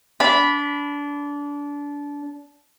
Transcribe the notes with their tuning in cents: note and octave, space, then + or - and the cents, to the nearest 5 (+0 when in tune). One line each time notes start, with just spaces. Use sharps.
D4 -25 B5 +0